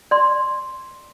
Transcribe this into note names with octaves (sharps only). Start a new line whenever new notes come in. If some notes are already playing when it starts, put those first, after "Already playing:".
D5 C6